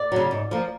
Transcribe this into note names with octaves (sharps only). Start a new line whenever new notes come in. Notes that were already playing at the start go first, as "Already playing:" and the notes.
Already playing: D5
C#3 F#3
G#2
F3 A#3